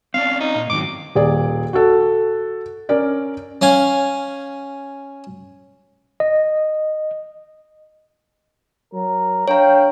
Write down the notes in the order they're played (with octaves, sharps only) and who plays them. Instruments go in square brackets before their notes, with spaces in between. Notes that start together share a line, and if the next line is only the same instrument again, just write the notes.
[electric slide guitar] C4 C#4 D5 [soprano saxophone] F5
[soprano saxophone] D#4
[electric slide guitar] A#2 A#3
[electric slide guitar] G#2 D#3 F#3 [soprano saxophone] D6
[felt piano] D#1 G#4 D5
F#4 A4
C#4 A#4 D5
[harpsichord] C#4 F5 G#5
[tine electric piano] D#5
[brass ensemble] F#3 A#4 A#5
[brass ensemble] D4 F5 G5 [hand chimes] C#5 A#5